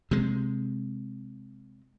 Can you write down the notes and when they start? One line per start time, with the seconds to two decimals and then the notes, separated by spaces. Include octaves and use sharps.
0.11 C3 G#3